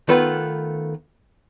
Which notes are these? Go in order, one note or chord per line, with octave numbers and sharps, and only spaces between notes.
D#3 A3 B3 F4 B4